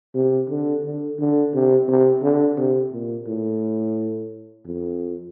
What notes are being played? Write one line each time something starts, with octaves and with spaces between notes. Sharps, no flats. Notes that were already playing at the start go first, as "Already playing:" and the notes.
C3
D3
D3
D3
C3
C3
D3
C3
A#2
A2
F2